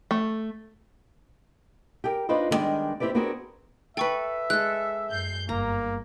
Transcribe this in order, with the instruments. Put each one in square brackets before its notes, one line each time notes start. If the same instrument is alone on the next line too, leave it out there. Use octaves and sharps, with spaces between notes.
[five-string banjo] A3
[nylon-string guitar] G4 G#4 A#4
D4 D#4 F4 B4 C5 D#5
D3 D#3 G3 G#3 B3 D4
C4 E4 G4 B4 D5
B3 C4 D4 F#4 G#4 A#4
[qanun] A4 B4 [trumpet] E5 [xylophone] G5 C#6
[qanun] G#3 A4 [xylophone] F#6
[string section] F#2 G6 C7
[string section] G1 [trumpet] A#3 [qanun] A#5